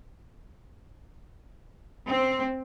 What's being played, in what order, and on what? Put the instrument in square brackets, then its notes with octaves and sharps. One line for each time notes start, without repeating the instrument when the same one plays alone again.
[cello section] C4